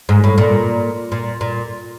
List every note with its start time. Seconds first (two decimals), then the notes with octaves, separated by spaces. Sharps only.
0.09 G#2
0.24 A2
0.38 A#2
1.12 A#2
1.41 A#2